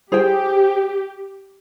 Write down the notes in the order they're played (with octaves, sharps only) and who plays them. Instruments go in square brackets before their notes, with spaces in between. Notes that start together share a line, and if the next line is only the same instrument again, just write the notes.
[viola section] G4 [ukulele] G#4 C5 G5